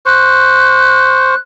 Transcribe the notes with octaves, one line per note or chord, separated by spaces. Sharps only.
C5 C#6 F#6